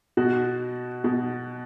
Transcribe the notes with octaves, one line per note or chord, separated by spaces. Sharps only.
B2 F#4
B2